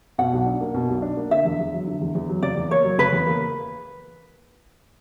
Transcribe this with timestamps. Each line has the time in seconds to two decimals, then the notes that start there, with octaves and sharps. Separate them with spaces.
0.18 B2 F#5
0.33 B1
0.46 D4
0.61 A#3
0.74 B2
0.89 B1
1.02 D4
1.17 A#3
1.31 D3 E5
1.45 E2
1.59 E2
1.73 F#3
1.87 D3
2.01 E2
2.15 E2
2.29 F#3
2.42 C#3 D5
2.56 E2
2.71 A#3 C#5
2.84 F#3
2.98 C#3 B4
3.13 E2
3.26 A#3